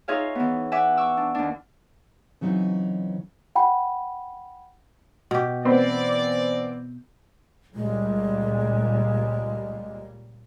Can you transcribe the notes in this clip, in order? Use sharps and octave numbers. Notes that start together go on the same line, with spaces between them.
D#4 F4 G#4 C#5 E5 F5
E3 B3
E5 F#5 G#5 D6
C#6 D6 E6
D4
D#2 D4
C#3 E3 F#3 C4 D#4
F#5 G5 B5
B2 G4
E3 B3 C4 D5 B5
C#2 A#2 G3 G#3